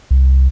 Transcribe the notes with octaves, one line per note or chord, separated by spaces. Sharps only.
C2